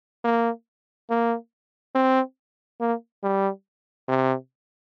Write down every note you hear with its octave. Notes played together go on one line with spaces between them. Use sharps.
A#3
A#3
C4
A#3
G3
C3